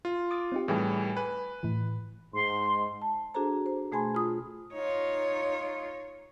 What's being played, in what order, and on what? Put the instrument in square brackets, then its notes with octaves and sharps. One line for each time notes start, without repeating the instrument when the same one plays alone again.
[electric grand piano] F4
[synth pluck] D6 D#6 A6
C4 D#4 G4
[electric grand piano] A2 E3 G3 [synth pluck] G#4 G#5
[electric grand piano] B4 [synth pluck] G#5 F#6
[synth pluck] A2 E3
[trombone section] G#2 [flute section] C6
[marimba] A5
D4 F#4 G#4 A4 C5 A#5
C5
B2 A3 G#4 G#5 B5 C6
F4 D#6
[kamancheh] D#4 F4 [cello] C#5